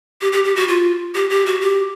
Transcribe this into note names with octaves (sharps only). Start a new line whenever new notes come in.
G4
G4
G4
F#4
F4
G4
G4
F#4
G4